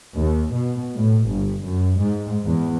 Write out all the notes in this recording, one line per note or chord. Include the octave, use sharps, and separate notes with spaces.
D#2
B2
A2
G1
F#2
G#2
E2